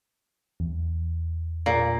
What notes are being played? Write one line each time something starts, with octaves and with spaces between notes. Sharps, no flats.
E2
A#2